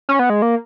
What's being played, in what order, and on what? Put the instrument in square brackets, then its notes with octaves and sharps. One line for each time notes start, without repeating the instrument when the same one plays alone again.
[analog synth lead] C#4
B3
G#3
A#3